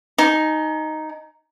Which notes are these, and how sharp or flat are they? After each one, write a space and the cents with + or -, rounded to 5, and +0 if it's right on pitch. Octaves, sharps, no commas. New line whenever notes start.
D#4 +0 G#5 +40